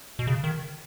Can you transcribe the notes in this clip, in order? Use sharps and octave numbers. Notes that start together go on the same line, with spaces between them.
B2
C#3
D#3